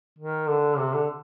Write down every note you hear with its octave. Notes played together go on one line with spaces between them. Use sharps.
D#3
D3
C3
D3